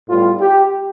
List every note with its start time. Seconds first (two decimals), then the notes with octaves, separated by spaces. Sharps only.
0.09 A2 G3 B3 F4
0.41 G4